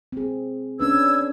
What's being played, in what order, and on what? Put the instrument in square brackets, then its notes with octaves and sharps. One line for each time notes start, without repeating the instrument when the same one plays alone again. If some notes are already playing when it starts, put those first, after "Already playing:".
[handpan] C4 G#4
[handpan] C#4 D4 B4 [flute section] E6 G#6